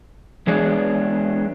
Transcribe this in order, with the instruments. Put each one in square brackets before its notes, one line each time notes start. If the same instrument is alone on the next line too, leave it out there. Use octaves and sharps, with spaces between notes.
[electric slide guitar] E3 G#3 B3 D4 G#4 C#5